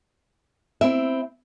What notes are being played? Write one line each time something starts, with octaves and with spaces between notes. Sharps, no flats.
C4 E4 E5